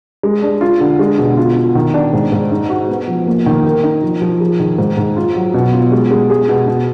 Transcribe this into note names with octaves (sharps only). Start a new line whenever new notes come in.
G#3
D4
F4
D3
G#3
B2
F4
F4
D#3
D4
G#2
G#2
D#4
F#4
B3
F3
A#3
D#3
A#4
D#4
F3
F3
G#4
D#3
G#2
G#2
F4
F#3
B2
F4
G#3
G#3
G#4
B2
B2